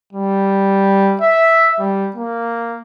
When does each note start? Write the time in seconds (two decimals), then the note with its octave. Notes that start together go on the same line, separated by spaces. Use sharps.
0.13 G3
1.22 E5
1.79 G3
2.16 A#3